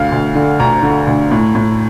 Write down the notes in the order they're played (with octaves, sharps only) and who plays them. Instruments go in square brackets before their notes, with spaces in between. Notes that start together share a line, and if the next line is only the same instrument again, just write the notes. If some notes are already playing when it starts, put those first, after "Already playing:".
Already playing: [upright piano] D2 F5
D2
D3
D2 A#5
D3
D2
A2
A2